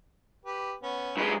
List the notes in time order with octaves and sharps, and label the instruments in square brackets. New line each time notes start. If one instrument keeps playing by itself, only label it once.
[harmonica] G4 B4
B3 C#4
[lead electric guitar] F#2 G#3 [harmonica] B4